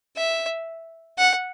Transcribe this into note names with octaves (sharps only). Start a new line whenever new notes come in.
E5
F#5